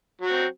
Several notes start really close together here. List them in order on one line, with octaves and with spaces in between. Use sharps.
F#3 F#4 C4